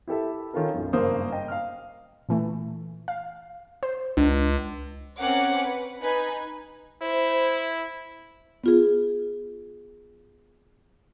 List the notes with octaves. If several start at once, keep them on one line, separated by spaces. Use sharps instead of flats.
E4 G4 A4 E5
D#3 C#4 F4 A4 A#4
B1 F#2
F#1 G2 A#3 C5 D#6
D#5 G5
F5 F6
A#2 E3 A3
F5
C5
C#2 D4
C4 C#4 A#4 F#5 D6
B4
D#4 B4 G#5
E4 C5
B3 F4 G#4